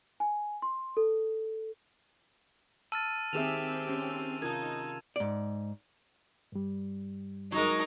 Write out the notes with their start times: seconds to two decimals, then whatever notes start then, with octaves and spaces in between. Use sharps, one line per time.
0.20 G#5
0.62 C6
0.97 A4
2.92 A5 E6 F6 A6 D#7
3.33 D#3 C4 G4 G#4 E5 E6 E7 F7
3.89 C#4
4.42 C3 D#4 F4 A#4 A5 G#6
5.16 G#2 D5
6.52 G2 G3
7.52 F#3 G#3 D#4 A#4